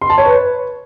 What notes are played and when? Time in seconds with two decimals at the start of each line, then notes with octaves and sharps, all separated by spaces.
0.02 C6
0.10 A5
0.18 C#5
0.26 B4